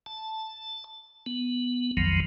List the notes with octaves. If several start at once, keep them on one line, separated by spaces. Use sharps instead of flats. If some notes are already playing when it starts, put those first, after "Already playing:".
A5
B3
B1 F2 D#3 F3 F#3